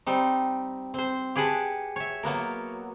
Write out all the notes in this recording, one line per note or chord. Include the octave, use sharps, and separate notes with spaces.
G3 C4 D#4
C4 C5
G4 G#4 B4 F#5 A5
C#5 E5
F#3 A#3 B3 A#4